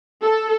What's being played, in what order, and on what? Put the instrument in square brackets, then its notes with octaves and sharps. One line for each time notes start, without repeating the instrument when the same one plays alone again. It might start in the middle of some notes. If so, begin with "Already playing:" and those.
[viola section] A4